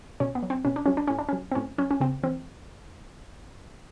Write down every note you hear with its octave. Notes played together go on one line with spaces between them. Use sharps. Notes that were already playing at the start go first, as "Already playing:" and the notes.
B2 C#4
B3
F#3
C4
B2 C#4
D4
F#3 C#4
D4
A2 C#4
D4
C#4
F#3
C4
A2 C#4
F#3 C#4
C#4
C#3 C4
E3 C4